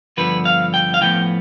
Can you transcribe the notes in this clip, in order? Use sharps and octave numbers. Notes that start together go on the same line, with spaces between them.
G2 D3 F3 B3 B4
F5
G5
F5
A2 F3 B3 G5